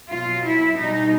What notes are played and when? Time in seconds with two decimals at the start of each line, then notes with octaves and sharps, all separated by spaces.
0.10 B2 F#3 F4
0.45 E4
0.78 B2 G3 D#4